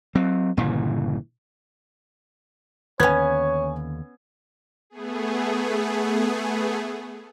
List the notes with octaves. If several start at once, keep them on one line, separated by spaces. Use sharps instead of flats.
F#3 C4
G1 A#2 C#3 E3
D#2 D3 B3 C#4 C#5 G#5 G#6
A3 B3 G#4